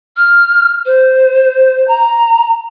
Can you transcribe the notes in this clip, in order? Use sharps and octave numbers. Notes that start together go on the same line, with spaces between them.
F6
C5
A#5